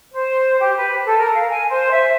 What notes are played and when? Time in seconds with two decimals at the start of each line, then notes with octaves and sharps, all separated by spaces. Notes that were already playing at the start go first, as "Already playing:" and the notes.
0.13 C5
0.59 G4
0.77 B4
1.04 A4
1.19 A#4
1.34 F5
1.48 G#5
1.69 C5
1.91 E5